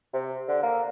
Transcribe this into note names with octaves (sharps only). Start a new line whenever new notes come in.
C3
D3
A#3